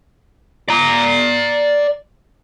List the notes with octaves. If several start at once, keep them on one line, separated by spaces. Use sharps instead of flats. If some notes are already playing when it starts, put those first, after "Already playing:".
D5 A#5